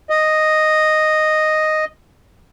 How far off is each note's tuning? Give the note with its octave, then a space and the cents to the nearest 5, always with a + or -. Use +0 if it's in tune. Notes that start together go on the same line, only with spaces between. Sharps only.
D#5 -5